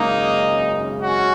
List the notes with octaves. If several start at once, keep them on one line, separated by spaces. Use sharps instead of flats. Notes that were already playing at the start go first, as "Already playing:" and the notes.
Already playing: G#1 F#2 C#3 G#3 A#3 D#4
C#4 F#4